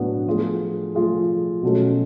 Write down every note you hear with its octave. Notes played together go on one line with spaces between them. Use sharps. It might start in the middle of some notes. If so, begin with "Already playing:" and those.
Already playing: A2 F#3 B3 D4 F#4
F3 A3 F4 G#4
F3 A3 F4 G#4
B2 F#3 A3 C#4